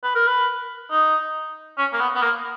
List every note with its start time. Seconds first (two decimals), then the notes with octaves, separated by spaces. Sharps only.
0.03 B4
0.15 A#4
0.27 B4
0.91 D#4
1.78 C#4
1.93 A#3
2.00 B3
2.15 B3
2.23 A#3